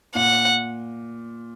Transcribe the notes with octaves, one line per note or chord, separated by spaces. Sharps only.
A#2 F#5